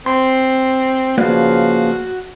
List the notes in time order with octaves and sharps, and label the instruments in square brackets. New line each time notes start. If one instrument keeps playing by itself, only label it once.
[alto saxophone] C4 [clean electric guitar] C6
[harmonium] C#3 F3 F5 [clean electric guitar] A#3 B4 D5 [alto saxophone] F#4